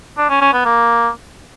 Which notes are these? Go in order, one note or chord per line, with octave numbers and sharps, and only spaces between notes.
D4
C#4
C#4
B3
A#3